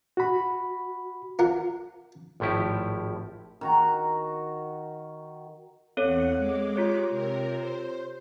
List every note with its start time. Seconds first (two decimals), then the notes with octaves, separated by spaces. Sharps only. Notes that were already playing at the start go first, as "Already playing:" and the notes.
0.17 F#4 B5
1.39 F4 A#4 F#5 A#5
2.40 G#1 A2 F3 E4 G4
3.61 D#3 F#4 A#5
5.97 E2 C4 A4 C#5 F#5
6.37 G#3 D6
6.76 F4 G4 C#5
7.11 C3 A#4
7.55 C5